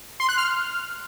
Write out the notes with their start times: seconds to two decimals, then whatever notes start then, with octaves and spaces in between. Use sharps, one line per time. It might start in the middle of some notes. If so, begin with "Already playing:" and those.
0.20 C6
0.29 F#6
0.37 F6